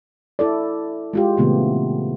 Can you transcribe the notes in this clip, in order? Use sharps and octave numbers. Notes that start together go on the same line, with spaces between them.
E4 A4 D5
G#3 F4 G4
A#2 C#3 E3 A3 B3 C4